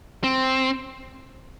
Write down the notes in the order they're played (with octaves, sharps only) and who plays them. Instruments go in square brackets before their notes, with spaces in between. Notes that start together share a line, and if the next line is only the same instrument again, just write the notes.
[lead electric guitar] C4